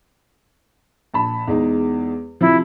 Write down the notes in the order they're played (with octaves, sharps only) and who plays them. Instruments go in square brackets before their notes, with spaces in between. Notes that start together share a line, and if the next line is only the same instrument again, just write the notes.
[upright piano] A#1 A5 B5
E2 G#3 D#4
[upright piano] C3 F3 [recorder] E4